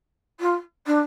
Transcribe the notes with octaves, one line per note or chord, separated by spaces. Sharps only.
F4
D4